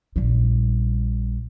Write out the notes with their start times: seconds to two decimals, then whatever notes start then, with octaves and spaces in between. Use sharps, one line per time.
0.16 A#1 G3